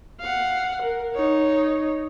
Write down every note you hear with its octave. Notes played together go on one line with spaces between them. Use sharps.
F5 F#5
A#4
D#4 C#5